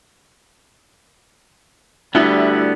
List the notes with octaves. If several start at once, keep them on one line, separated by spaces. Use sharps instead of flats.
D2 D3 G3 B3 E4